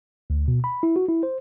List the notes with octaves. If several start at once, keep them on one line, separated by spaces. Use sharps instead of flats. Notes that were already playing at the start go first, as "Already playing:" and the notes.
D2
B2
B5
E4
F#4
E4
C5